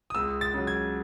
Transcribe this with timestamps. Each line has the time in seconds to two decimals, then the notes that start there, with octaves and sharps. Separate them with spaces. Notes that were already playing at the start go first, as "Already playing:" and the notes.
0.10 D#6
0.15 C#2 E6
0.41 A6
0.54 C#3 F#3
0.67 G#6